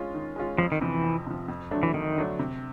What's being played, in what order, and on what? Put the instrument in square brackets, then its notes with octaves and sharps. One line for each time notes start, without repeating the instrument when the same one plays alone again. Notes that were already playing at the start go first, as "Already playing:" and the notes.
Already playing: [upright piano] G#3 C#4 F4
D#3
G#3 C#4 F4
[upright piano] F2 [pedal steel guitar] F3
[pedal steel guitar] D#3
[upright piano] C3 F3 [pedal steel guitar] E3
[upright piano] F2
C3 F3
F2
D3 F#3 A3 D4
[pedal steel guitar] E3
[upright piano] F2 [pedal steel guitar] D#3
[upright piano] D3 F#3 A3 D4
C3